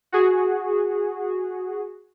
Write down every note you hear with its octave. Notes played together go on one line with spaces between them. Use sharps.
F#4 G#4